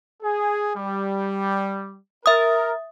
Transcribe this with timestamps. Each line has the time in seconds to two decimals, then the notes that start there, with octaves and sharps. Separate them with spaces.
0.23 G#4
0.76 G3
2.26 A#4 E5 D#6